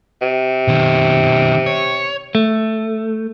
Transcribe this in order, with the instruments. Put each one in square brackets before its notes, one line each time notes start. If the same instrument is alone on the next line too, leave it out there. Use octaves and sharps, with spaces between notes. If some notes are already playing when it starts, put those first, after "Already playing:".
[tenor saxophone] C3
[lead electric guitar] B2 D#3
C#5
[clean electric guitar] A3